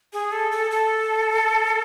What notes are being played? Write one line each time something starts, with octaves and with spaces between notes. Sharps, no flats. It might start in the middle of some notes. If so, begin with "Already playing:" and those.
G#4
A4
A4
A4